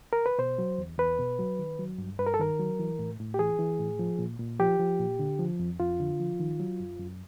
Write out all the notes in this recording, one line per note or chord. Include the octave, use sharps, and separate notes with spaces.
A#4
B4
B2 C5
F#3
E2
E2 B4
B2
F#3
D#3
F#3
G2
G2 B4
A#4
A4
D#3 A#4
F#3
E3
A2
A2
G4
E3 G#4
E3
A2
F3
A#2
A#2
F3 G4
F3
A#2
D3
F3
F2
F2 F4
D3
F3
D#3
F#3
F#2
F#2